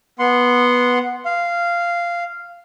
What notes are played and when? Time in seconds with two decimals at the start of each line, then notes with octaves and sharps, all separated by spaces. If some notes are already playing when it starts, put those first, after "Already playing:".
0.19 B3 F#5 C6
1.25 F5